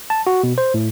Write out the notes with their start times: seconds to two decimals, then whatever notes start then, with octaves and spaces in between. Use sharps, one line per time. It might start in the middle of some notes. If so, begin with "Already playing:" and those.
0.10 A5
0.27 F#4
0.43 B2
0.58 C5
0.74 A2